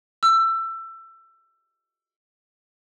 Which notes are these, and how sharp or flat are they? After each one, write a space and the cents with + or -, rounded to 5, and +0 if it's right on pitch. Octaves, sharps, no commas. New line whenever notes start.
E6 +20